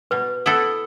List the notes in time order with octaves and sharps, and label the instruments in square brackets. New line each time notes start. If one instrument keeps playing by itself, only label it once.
[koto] B2 [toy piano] B4
[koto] B3 E4 A4